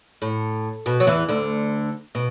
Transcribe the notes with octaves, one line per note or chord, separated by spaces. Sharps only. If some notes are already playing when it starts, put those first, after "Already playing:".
A2
B2
F#3
E2 E3
D2 D3
B2